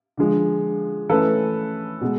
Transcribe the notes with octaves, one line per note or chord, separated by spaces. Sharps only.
D3 F3 G#3
E3 A3 C#4 A4 B4
B2 G#3